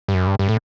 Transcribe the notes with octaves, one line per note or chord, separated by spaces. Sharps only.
G2
F#2
G2
G2
A2